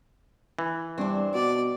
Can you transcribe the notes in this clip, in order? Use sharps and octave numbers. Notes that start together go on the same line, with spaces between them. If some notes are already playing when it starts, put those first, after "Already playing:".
E3
G2 C4 D4
B2 D5